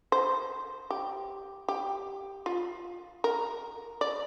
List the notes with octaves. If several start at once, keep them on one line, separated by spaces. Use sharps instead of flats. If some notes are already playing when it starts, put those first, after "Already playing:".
C5
G4
G4
F4
A#4
D5